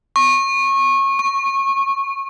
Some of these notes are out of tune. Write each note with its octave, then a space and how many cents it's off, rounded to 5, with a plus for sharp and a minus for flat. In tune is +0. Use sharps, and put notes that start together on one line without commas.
C#6 -25
C#6 -10